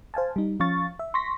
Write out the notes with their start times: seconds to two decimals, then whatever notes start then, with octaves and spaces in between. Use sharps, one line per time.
0.14 C5 F5 G#5 A5
0.36 G3 D#4
0.60 F3 C#4 F5 C#6 A6
0.99 E5
1.14 C6 C#6 A#6 B6